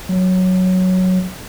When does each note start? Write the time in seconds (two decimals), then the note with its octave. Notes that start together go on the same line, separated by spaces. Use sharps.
0.09 F#3